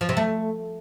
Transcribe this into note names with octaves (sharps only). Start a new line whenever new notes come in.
F3
C3
A3